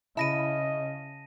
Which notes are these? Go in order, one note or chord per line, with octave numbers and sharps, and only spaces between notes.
C#3 E4 D#5 A5 A#6 D#7